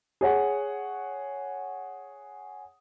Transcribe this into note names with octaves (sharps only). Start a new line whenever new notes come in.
G#4 C#5 F#5